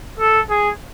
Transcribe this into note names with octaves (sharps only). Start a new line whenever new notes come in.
A4
G#4